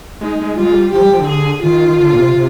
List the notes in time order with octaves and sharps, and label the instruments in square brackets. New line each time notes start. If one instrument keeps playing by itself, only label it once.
[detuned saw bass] G#3 [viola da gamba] D#4
[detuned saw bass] G#3
[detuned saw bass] G3 [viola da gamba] F4
[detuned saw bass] G#3
G3
[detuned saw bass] F3 [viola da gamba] G4
[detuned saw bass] G3
F3
D3
[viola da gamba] G#4
[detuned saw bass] D#3 [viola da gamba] F4
[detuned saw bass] D#3
D3
A#2
C3
C3